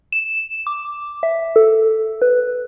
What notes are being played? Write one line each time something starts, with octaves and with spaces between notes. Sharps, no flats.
E7
D6
E5
A4
B4